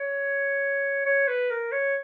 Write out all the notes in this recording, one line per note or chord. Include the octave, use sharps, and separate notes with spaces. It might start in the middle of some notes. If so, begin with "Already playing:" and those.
Already playing: C#5
C#5
B4
A#4
C#5